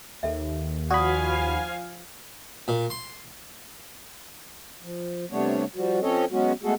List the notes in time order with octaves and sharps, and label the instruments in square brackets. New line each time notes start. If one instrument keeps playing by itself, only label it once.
[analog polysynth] D#2 [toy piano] A4 E5
[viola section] F3 F5 G#5 [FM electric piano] F#4 B5 [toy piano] D5 D#6
[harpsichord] A#2
C6
[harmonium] F3
C3 G3 A3 B3 D4 C#5
F3 G3 F#4
F3 C4 C#4 A4 C#5 D#5
F#3 G#3 B3 C#4 F#4
G#3 A3 B3 F#4 G#4 A4